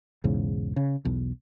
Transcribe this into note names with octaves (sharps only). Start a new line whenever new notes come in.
B1 E2 G#2 C#3
C#3
B1 E2